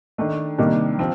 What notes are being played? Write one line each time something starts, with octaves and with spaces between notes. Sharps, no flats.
D#3 A3 D4
C3 D#3 G3 A#3 D4
F3 C4